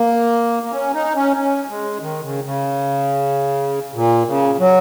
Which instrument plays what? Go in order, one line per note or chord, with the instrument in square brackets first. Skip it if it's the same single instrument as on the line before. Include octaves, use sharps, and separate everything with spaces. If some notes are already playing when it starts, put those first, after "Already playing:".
Already playing: [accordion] A#3
A#3
C#4
D#4
C#4
C#4
G#3
D#3
C#3
C#3
A#2
C#3
F#3